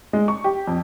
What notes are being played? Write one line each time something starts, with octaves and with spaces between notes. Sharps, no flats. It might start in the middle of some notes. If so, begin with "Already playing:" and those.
G#3
C#6
G4
F2